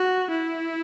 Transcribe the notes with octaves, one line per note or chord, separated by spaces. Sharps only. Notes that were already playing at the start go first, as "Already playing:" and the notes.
Already playing: F#4
E4